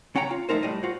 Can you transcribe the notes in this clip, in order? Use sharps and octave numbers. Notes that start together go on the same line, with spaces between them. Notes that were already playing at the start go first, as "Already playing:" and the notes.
C#2 C#4 F#5 G5 A#5
F4
F3 A3 C4 D#4 A#4 C5
A2 G3 D#5
F4 F#4 C5